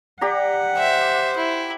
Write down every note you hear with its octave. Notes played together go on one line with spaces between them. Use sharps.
G4 D5 F#5 A#5
C5 E5
E4